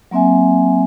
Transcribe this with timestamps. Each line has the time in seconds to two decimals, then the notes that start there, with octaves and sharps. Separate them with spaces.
0.11 F#3 A#3 C4 E5 G#5